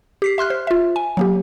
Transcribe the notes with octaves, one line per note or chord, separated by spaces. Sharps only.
G4 B6 C7
E5 C6 F6 F#6
C5
F4 E5
G#5
F#3 A#3 G4